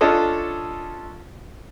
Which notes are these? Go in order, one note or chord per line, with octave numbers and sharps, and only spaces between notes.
C#4 D4 F4 A4 C#5 D#5